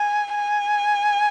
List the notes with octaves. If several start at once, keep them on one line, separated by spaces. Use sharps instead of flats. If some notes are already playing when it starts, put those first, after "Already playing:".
Already playing: G#5
G#5